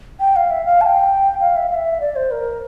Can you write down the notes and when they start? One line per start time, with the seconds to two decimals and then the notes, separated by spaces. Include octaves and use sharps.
0.20 G5
0.36 F5
0.51 E5
0.66 F5
0.81 A5
0.86 G5
1.40 F5
1.56 E5
1.71 F5
1.75 E5
2.01 D5
2.16 C5
2.31 A#4